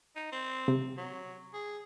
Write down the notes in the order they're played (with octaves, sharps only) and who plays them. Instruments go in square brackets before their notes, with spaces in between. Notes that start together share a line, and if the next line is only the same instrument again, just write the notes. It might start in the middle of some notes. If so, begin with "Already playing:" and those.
[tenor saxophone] D#4
C4
[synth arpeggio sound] C3
[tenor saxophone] F#3
G#4